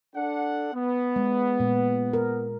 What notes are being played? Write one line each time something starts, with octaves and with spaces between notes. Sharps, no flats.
D4 A4 F#5
B3
G#3
A#2 G#3
A#4